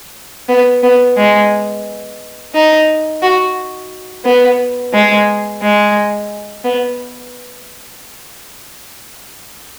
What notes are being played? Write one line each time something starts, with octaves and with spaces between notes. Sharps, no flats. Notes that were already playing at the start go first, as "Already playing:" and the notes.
B3
B3
G#3
D#4
F#4
B3
G#3
G#3
B3